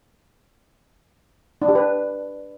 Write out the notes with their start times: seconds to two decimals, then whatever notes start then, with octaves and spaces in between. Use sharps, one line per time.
1.62 D4
1.68 G4
1.75 B4